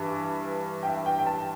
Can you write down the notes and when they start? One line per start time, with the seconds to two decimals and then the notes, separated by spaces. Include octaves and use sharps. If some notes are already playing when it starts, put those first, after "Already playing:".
Already playing: G2 E3
0.83 G5
0.87 E5
1.06 G5
1.19 G5
1.26 A5